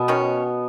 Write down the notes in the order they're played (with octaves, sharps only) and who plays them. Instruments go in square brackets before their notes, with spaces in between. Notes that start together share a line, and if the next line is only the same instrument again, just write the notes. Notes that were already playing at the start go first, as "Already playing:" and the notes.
Already playing: [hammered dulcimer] B2 B3
[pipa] D#3 F#3 C#4